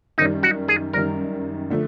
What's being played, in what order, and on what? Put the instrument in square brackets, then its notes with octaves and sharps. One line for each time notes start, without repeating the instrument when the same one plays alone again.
[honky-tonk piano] F#2 D#3 G3 [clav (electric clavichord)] D#4
[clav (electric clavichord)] F#4
G#4
[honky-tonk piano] F#2 D#3 G3 [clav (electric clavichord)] A#4
[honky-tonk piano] D3 F3 A3